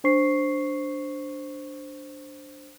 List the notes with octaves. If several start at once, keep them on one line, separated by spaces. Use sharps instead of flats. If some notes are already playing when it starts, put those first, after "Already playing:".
D4 C5 C#6 C7